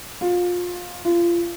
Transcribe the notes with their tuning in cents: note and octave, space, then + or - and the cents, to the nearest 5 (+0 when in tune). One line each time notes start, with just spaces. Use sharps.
F4 +25
F4 -25